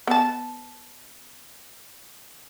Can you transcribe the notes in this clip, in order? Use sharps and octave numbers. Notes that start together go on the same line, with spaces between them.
B3 A5